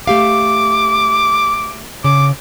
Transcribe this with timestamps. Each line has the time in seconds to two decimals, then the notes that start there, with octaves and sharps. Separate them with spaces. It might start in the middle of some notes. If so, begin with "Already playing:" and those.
0.07 A3 G4 F5 D6
2.04 C#3 D6